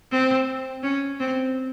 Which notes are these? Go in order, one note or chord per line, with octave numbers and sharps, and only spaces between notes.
C4
C#4
C4